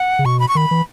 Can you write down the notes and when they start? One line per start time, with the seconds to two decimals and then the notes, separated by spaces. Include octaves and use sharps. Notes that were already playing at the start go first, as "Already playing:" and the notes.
Already playing: F#5
0.19 C#3
0.25 B2 C#6
0.40 B5
0.48 C#6
0.55 D#3 B5
0.71 E3